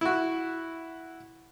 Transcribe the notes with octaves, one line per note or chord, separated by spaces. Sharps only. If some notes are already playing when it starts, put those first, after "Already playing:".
E4 F#4